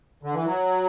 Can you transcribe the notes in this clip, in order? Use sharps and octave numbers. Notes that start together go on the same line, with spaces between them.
D3
E3
F#3